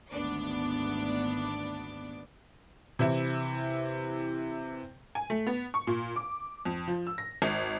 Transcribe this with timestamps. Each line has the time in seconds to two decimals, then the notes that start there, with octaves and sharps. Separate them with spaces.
0.11 G#1 D2 B3 D4 D6
2.99 C3 E3 E4
5.15 G#5
5.30 A3
5.47 B3
5.74 C#6
5.87 A#2
6.16 D6
6.65 F2
6.88 F3
7.07 E6
7.18 A#6
7.42 G#1